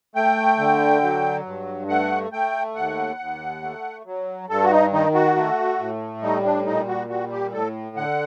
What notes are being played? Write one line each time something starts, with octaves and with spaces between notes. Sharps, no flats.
A3 G5
D3
F#3
G2
A3 F#5
A3 G5
D#2 F#5
D#2
A3
F#3
G2 A4
F#4
D#4
D#3 D#4
F#4
A3
A2
G3 D#4
D4
A#2 D#4
F#4
G3 F#4
G4
A2 A4
D3 F#5